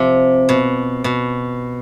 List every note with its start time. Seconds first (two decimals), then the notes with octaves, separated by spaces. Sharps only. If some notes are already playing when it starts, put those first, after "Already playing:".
Already playing: C3 F3
0.49 B2
1.04 B2